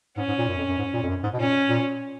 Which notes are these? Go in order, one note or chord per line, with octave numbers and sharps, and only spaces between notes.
G#2 C#4
G#2
A#2
F#2
F2
F#2
G#2
A#2
F2
F#2
G#2
B2
A#2 C#4
A#2